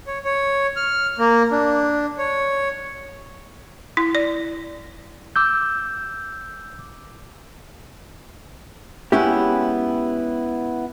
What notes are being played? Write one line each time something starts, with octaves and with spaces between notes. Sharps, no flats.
C#5
C#5
F6
A#3
D4
C#5
E4
D5
D6 E6 G6
G#3 B3 C#4 E4 G4